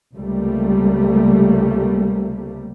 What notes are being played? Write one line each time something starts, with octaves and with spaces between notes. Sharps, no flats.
C#2 C3 G3 A3 A#3